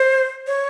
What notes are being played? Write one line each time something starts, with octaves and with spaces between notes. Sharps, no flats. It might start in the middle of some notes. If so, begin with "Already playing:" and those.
Already playing: C5
C#5